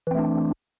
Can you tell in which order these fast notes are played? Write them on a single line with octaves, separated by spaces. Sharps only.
E3 C4 A3 D4